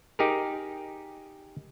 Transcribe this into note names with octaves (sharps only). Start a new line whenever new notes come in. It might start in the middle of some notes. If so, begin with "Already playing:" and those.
D#4 G4 G#4 A#4